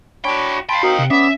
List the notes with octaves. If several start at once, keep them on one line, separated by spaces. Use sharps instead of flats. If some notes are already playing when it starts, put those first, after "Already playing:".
D4 F#4 C#5 G5 B5
F5 G5 A5 B5 C6
C4 D#4 F#4 A#4
C3
B3 C#4 D5 E5 D#6